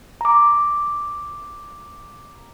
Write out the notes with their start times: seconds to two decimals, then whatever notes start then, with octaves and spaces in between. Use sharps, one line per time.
0.21 A#5 D6